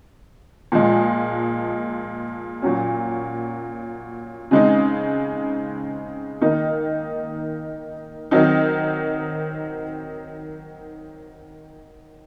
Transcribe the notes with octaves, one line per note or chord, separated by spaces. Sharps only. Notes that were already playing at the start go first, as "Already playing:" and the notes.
A#2 F3 G#3
A#2 F#3 C#4
C#3 G#3 C4 D#4
D#3 A#3 D#4
D#3 F#3 C4 D#4